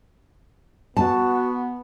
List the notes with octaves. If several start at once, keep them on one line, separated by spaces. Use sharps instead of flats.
B3 F#4 A5